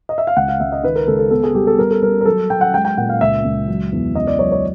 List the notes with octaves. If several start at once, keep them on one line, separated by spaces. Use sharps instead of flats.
D#5
E5
F5
C#2 F#5
F5
C#2 E5
D#5
D#3 B4
A#4
C#2 A4
A4
B3 A4
G#4
G3 G4
A4
G3 A#4
A4
G3 A#4
A#4
F#3 A4
F#3 G5
F#5
G#3 G5
G5
A#2 F#5
F5
C#2 E5
C#2
F#3
E2
C#2 D#5
D5
F#3 C#5
C#5